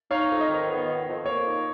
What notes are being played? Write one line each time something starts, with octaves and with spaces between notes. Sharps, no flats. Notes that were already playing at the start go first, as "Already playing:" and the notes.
D#4 C#5 F5
F2
D#5
D#3
B3
D#3
F2
A#3 C#5
D#4